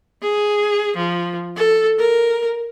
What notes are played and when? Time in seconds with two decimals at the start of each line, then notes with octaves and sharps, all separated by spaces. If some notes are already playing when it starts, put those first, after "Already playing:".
0.22 G#4
0.96 F3
1.56 A4
1.98 A#4